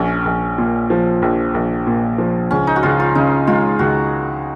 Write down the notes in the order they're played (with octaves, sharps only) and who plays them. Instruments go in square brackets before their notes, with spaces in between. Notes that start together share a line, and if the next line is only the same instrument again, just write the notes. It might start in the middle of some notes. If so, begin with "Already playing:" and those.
Already playing: [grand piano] A#1 [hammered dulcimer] C#4
[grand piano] A#1
A#2
F3
A#1
A#1
A#2
F3
[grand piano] C#2 [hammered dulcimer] C#4
[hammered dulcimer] D#4
F#4
[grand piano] C#2 [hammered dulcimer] F4
[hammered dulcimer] F4
[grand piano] C#3 [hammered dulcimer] D#4
[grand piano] G#3 [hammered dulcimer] F4
[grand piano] C#2 [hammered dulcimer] F#4